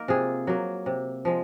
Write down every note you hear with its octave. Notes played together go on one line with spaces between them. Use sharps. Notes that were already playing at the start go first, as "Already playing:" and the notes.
Already playing: A#3 D#4 A#4
C3 F4 G#4
F#3 A#3
C3
F3 G#3